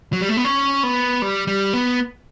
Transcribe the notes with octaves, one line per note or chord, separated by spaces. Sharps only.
F#3
G3
A3
B3
C#4
B3
G3
G3
B3